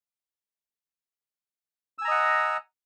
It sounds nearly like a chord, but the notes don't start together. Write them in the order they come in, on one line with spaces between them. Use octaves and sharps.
E6 G#5 A#5 D#5 F#5